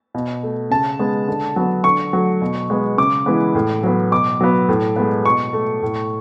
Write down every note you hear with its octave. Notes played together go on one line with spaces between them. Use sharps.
B2
A3
C#3 A5
G#3 B3
D3
F#3 B3
D3 C#6
F#3 A3
B2
G#3 B3
C#3 D6
E3 G#3 B3
A2
F#3 B3
B2 D6
F#3 B3
A2
G#3 B3
B2 C#6
A3
A2